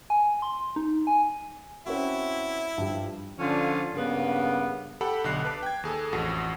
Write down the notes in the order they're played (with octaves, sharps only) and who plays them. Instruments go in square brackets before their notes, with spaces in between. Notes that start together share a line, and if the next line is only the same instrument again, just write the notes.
[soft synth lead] G#5
C6
D#4
G#5
[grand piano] C4 C#4 F#4 [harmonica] E4
[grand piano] G2 F3 G3
[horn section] D3 F3 C#4 D4 F4
G2 C#3 A#3 B3
[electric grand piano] G4 A4 F#5 B5
B1 D3 F#6 C7
B4 A5 D6
G5 G#6
D#2 G#4 A4
A1 F2 F#4